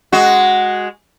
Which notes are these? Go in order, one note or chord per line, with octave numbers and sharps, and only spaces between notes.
G#3 F#4